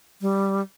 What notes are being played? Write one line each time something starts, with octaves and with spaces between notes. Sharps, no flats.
G3